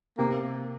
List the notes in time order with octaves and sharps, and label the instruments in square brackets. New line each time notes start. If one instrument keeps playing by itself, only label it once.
[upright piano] C3 [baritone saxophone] A#3